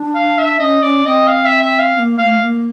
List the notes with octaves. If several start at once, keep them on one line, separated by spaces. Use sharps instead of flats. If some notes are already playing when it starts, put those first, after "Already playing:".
Already playing: D4
F5
E5
C#4 D#5
C#4 D5
C4 D#5
F5
E5
E5
F5
C4
A#3
A#3 F5
A3
A#3